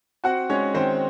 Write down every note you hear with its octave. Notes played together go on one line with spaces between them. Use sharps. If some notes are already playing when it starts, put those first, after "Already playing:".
C4 F#4 F#5
G#3 C#4 C#5
D#3 C4 C5